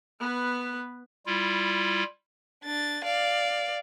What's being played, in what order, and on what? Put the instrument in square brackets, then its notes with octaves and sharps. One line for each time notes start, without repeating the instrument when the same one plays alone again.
[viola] B3 B4
[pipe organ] G3 E4 F4
[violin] D4 A6
D5 F5